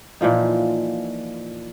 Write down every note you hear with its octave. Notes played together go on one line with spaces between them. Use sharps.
A#2 E3 F3 D#4